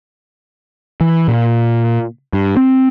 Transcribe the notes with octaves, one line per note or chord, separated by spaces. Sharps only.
E3
A#2
G2
C4